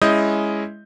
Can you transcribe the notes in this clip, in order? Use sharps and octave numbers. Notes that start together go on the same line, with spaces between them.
G#3 C#4 E4 D#5 D#6 G6